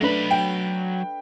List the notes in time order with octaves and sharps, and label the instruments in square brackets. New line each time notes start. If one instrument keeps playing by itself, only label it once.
[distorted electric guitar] F#3 B5 [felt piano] A3 D4 B4
[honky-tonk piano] G5